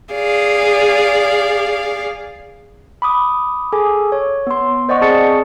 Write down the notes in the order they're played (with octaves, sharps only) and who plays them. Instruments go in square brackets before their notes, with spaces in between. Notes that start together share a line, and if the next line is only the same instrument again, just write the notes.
[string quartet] G#4 D5 F5
[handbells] B5 D6 D#6
G#4 A4 G#5 D6
C#5
B3 C6
C5 D5 D#5 F#5 C#6
C4 G#4 A5 A6 C#7